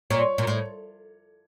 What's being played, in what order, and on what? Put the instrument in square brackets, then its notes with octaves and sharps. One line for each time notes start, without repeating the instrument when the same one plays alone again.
[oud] A#2 [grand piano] C#5
[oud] A#2
A2